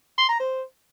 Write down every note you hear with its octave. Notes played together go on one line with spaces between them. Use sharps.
C6
A#5
C5